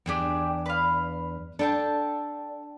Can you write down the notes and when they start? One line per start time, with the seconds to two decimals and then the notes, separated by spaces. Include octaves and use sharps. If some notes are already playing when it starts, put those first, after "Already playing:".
0.06 E2 D4 G4 G#4 G5
0.66 B4 F5
1.59 D4 A4 G5 A5